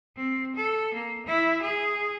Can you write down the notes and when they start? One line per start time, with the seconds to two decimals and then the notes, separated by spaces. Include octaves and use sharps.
0.17 C4
0.56 A4
0.94 A#3
1.26 E4
1.62 G#4